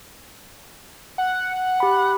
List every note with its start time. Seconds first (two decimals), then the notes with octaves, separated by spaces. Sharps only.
1.18 F#5
1.80 G4 B5